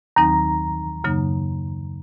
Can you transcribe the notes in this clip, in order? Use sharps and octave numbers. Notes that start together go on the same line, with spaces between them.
D#2 D#3 F#3 C4 D#4 A#5
F#2 C#3 F#3 A#3 D#4